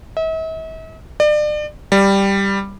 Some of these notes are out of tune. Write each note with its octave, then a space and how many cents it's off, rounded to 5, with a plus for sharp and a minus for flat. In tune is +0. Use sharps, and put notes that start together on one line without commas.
E5 -45
D5 +35
G3 +5